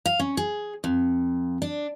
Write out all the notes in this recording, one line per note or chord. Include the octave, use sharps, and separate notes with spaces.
F5
C#4
G#4
F2
D4